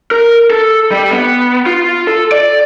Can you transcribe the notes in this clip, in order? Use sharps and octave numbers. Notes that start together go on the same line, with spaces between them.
A#4
A4
G3
B3
F4
A4
D5